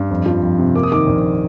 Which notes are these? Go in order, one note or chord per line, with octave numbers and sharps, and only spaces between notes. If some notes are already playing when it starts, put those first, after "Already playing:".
Already playing: G2
F2
F3
F2
C3
A#3 D6
D#6
D#3 D6
A#1